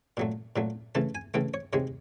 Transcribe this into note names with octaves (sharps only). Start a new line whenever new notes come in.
A#2 F#3 A3
A#2 F#3 A3
C#3 E3 A3 A5
G#5
C#3 E3 A3 G5
C#5
C3 D#3 G#3 C#5